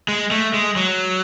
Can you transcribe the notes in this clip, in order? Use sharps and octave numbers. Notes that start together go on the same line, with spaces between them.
G#3
A3
G#3
F#3